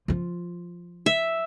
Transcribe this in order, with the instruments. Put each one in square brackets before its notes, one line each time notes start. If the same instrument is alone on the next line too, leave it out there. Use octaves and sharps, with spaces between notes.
[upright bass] F3 F4
[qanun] E5